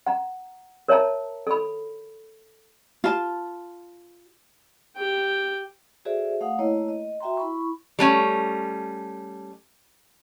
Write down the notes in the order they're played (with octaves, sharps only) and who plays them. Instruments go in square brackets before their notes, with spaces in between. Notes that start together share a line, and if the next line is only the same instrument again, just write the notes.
[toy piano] F#5 A#5
A#4 C#5 E5 A5 A#5
A4 B5
[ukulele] F4 A5
[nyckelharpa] G4 G5
[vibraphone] F#4 G#4 A4 C5 D5 E5
A3 F5 F#5 D#6
A3 A#3 E4 C#5 D#5
D#5
F#4 E5 G5 A#5 C6
E4 B5 C#6
[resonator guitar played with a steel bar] G3 A3 C#4